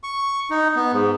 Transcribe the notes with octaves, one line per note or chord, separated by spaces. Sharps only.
C#6
D#4
B3
G#2